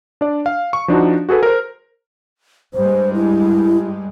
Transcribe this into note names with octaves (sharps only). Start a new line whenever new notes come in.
D4 D5
F5
C#6
F3 D4 D#4 F#4
F#4 G#4 A4 B4
A#4 C5
G2 G3 G#3 C5
E4